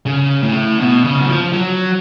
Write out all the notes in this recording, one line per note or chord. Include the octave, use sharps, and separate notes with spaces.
C#3
A2
B2
C#3
F#3
F3
F#3